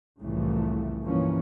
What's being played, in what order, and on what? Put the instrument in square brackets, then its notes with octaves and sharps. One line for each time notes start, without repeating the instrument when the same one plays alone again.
[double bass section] C2 F2 A2 C#3 E3 A3
G2 A#2 E3 F3 A#3 C#4